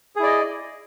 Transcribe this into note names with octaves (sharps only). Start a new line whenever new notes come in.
E4 G#4 D5 D#5